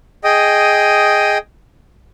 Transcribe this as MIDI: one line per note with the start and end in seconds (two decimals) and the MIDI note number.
0.24 1.38 68
0.24 1.38 75
0.24 1.38 79
0.24 1.38 87